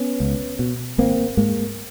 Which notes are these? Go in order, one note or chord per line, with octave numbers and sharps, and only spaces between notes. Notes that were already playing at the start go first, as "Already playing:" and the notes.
Already playing: B3 C#4
C#2
B2
G#1 A#3 C4
G#2 G#3 A#3